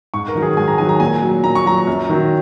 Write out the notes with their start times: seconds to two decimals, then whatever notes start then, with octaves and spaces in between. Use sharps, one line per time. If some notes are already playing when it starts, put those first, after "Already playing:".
0.14 G#2 C#6
0.28 A#4
0.35 D#3 F#3
0.42 G#4
0.57 G#2 G#5
0.68 A#5
0.78 D#3 F#3 G#5
0.89 A#5
1.00 A#2 G#5
1.22 F#3
1.44 A#2 A#5
1.55 C#6
1.66 F#3 A#5
1.87 F#2
2.09 D#3 F#3